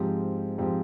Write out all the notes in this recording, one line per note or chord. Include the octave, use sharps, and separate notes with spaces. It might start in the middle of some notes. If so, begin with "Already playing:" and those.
Already playing: G#2 F3 C4 G4
G#2 F3 C4 G4